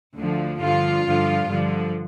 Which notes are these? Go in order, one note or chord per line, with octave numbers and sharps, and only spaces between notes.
D2 D3 F3
G2 D3 F3 F4
G2 D3 F3
G2 D3 F3